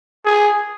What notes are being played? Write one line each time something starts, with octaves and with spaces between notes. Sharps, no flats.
G#4